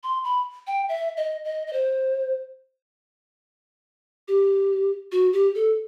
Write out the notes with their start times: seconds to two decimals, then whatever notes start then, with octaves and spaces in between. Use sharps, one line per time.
0.03 C6
0.24 B5
0.67 G5
0.89 E5
1.17 D#5
1.45 D#5
1.67 D#5
1.73 C5
4.28 G4
5.12 F#4
5.33 G4
5.55 A4